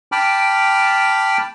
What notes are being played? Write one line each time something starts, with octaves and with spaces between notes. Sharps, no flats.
G5 A5 B5 D6 F6